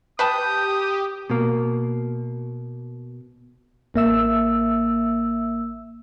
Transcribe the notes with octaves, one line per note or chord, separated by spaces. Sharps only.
G4 B4 G5 A5 D#6 G6
B2 A#3
A1 A#3 E5 E6